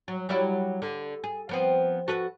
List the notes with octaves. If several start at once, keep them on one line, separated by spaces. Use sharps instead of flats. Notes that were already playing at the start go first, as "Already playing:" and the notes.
F#3
F#3 G3 E4
D3
G#4
F3 B3 C4
F#4 A4 B4